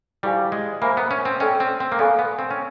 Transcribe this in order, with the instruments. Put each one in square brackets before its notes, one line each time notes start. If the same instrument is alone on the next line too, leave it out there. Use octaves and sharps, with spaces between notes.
[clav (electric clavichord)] G3 [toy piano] E4 G4 C5 F5 G#5
[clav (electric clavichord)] G#3
[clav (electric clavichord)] A#3 [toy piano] C5 E5 G#5 B5
[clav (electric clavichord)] B3
C#4
C4
[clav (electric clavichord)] C#4 [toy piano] A4 D5 G5
[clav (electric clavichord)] C4
C4
A#3
[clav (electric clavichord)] B3 [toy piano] A4 D5 F5 G#5 C#6
[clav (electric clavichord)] B3
C4
C#4